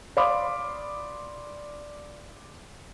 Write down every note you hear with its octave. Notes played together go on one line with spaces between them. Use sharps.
D5 F5 B5 C6 D6 D#6